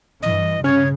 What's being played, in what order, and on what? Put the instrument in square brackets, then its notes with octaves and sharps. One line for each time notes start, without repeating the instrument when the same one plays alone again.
[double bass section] G2 E3 [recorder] D#5
[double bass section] C#3 [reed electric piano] C#4 F6 [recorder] C#5